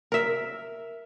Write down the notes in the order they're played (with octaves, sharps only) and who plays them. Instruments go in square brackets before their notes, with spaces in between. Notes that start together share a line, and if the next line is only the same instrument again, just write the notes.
[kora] A#4 E5